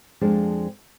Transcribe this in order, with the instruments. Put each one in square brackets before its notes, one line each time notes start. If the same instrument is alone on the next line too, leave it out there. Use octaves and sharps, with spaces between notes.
[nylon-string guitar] F2 F3 G#3 D4 G#4 D5